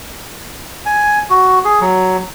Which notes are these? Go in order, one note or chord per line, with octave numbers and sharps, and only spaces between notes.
G#5
F#4
G#4
F#3